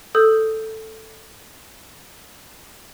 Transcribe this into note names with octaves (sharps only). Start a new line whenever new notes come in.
A4 D#6 E6 G6